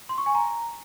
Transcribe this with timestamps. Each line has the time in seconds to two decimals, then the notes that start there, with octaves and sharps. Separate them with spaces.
0.09 C6
0.18 C#6
0.26 G#5
0.35 A#5